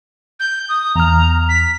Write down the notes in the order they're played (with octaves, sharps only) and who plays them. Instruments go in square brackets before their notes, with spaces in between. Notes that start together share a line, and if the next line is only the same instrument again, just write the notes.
[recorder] G6
D#6
[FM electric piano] E2 F6 [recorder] A#5
[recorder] B6